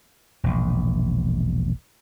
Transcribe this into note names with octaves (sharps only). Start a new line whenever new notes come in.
E1 A#1